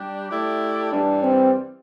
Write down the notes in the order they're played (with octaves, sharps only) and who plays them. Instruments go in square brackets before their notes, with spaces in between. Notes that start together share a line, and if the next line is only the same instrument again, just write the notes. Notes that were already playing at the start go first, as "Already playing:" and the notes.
Already playing: [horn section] G3 D4 G4
A3 E4 G4 D5
[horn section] G2 E3 G3 [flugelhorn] D4
[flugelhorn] C4